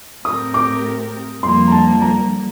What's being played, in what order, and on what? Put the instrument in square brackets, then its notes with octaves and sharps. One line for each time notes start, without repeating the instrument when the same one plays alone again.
[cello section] A2 A3 C4 G4 A#4 [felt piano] D#6
[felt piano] D6
[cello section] F2 D3 G3 A#3 [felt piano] C6
[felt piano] A#5
A5
A#5